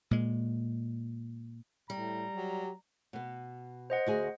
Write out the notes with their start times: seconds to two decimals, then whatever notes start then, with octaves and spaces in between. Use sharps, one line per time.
0.11 A#2 G#3
1.90 A2 G3 A#5
2.35 F#3 G4
3.13 B2 B3
3.90 C5 D#5 F#5
4.07 D2 F#4 G#4